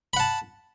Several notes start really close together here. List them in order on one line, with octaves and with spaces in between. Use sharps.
B5 F#5 A5